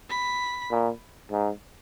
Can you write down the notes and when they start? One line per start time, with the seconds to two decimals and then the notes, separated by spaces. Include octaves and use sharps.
0.10 B5
0.71 A#2
1.32 G#2